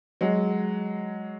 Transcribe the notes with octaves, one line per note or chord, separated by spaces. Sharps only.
F#3 G#3